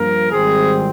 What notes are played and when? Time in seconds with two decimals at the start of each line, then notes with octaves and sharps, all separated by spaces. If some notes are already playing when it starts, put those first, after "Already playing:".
Already playing: G2 F3 A#3 A#4
0.32 G#1 G#2 G3 C4 G#4